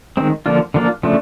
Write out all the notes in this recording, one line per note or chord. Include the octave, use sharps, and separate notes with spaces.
D#3 G#3 C4
D3 F3 A#3 D4 F4
D3 F3 A#3 D4 F4
C#3 F3 A3 D4